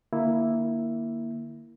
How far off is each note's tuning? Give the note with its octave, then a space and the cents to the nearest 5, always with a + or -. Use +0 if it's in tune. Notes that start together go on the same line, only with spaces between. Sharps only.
D3 +40 A#3 +0 E4 +0